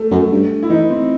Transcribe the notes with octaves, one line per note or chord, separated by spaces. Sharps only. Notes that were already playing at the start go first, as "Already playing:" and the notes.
Already playing: A3
F#2
G2
E4
E3 D#4
C4